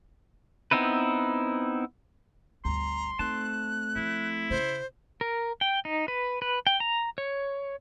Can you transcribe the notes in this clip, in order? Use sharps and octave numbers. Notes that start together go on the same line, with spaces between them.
B3 C4 D#4 E4 B4
G1 D2 A#5 C6
A3 C4 D#4 A5 F#6
F3 E4
C#3 C#4 C5
A#4
G5
D#4
B4
B4
G5
A#5
C#5